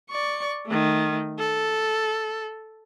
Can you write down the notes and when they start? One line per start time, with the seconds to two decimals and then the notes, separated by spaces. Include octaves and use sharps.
0.10 D5 C#6
0.66 D#3 A3
1.39 A4